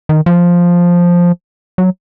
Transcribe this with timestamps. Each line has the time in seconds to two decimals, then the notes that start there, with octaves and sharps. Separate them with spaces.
0.09 D#3
0.26 F3
1.78 F#3